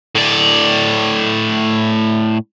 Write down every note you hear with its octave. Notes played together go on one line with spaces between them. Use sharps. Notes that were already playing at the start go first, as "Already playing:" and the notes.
A2 D5